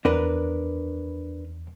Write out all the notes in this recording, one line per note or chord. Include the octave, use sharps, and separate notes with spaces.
E2 D4 A#4 B4